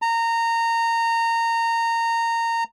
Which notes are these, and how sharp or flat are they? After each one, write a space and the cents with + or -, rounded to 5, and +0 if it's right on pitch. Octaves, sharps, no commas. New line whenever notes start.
A#5 -20